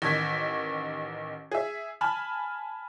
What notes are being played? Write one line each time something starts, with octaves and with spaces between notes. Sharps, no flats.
A1 D#3 G#6 B6
G#4 E5
G#5 A5 B5 F6